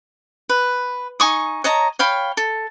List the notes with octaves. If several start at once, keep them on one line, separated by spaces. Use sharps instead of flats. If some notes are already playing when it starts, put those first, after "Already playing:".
B4
D#4 G#5 C#6 D#6
C#5 D#5 A5 A#5
C#5 F5 G5 B5
A4